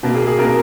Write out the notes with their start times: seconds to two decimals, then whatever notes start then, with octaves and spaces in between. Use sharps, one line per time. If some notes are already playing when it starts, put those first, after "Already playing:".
0.03 B2 A#3
0.15 G#4
0.27 G#4
0.39 B2 A#3 A#4